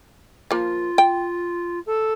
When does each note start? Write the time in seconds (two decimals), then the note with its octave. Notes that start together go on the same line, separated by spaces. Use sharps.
0.51 F3 A#3 F4
0.98 G5
1.86 A4